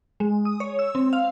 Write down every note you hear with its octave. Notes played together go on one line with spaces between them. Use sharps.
G#3
D#6
C#5
E6
C4
F5